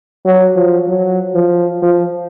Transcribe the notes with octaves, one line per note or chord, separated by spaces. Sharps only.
F#3
F3
F#3
F3
F3